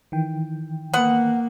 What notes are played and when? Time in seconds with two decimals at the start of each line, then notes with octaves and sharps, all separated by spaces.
0.12 D#3 E3 G5
0.93 A#3 B3 F#5